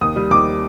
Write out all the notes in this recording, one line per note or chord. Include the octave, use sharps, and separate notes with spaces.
D#2 D#6
G3
D#2 D6